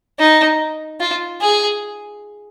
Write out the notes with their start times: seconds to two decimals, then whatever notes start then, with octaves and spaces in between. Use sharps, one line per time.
0.19 D#4
1.00 F4
1.41 G#4